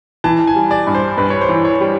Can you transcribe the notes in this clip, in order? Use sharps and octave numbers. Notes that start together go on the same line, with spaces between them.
E3 A5
G#5
G3
D5
G2
C5
G2 B4
C#5
C5
E3
C#5
G3